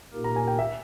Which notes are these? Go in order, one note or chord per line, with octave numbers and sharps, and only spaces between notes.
A#2 A#3 D#4 G4 A#4
A#5
G#5
G5
E5